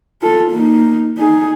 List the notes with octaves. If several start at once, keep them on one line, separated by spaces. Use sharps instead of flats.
F4 A4
A#3 D#4
D#4 G#4